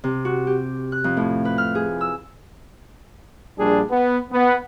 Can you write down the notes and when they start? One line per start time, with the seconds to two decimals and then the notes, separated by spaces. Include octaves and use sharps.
0.04 C3
0.25 F#4
0.47 G4
0.92 F#6
1.04 F2
1.17 A2
1.45 B4
1.58 F6
1.75 G#4
2.01 E6
3.58 A#1 G3 D4 G#4
3.90 B3
4.32 B3